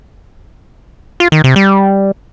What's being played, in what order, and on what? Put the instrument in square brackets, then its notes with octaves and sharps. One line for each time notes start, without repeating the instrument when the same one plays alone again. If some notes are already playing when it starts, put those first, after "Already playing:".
[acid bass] F4
D#3
C3
G3